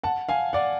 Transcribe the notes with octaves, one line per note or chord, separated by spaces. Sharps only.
F#5 A5
F5 G#5
D5 F#5